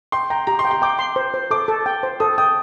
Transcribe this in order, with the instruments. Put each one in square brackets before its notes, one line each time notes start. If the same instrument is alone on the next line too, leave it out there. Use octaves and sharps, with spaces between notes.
[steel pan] G5 [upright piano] C6
[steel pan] G5 [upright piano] A#5
[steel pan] G4 [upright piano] A#5
[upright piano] C6
[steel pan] G5
[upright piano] C6
[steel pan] G5 [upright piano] D6
[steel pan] C6
C5
C5
[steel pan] A4 [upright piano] D6
[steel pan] A4
G5
C5
[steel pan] A4 [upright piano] D#6
[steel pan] G5 [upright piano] D#6